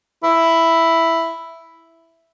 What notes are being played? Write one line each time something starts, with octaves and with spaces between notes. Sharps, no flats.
E4